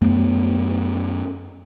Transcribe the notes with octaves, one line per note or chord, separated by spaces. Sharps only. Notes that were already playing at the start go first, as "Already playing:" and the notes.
F#2 A3 B3